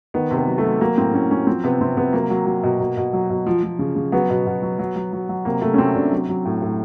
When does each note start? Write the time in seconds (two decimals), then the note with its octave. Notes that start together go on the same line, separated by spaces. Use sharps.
0.14 D#3 B3
0.31 C3
0.37 B3
0.47 F#3
0.58 A3
0.63 F#3
0.80 F#3 A#3
0.97 A2 C4
1.14 A2 C#4
1.31 F#3 C#4
1.46 F3 C4
1.63 C3 B3
1.81 C3 C4
1.97 C3 B3
2.13 F#3 A#3
2.30 F#3
2.46 F#3
2.63 B2
2.80 B2
2.97 B2
3.13 F#3
3.30 B2
3.46 F3
3.63 F3
3.79 C#3
3.96 C#3
4.12 F#3 B3
4.30 B2
4.47 B2
4.62 F#3
4.79 F#3
4.96 F#3
5.13 F#3
5.29 F#3
5.45 C3 A#3
5.62 C3 A3
5.74 C#4
5.78 C3 C4
5.95 C3 D4
6.11 F#3
6.29 F#3
6.45 A2
6.62 A2